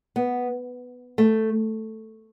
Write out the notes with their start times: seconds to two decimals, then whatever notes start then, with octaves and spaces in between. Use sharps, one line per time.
0.16 B3
1.18 A3